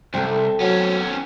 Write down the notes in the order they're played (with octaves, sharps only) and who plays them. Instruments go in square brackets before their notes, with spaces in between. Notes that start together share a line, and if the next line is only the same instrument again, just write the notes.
[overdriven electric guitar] C2 [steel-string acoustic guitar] C4 A4
[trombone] F#3 [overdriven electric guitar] B3 C#4